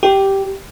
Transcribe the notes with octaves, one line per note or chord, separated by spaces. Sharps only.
G4